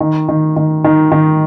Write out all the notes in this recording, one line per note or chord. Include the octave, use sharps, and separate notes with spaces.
D#3
D#3
D#3
D#3
D#3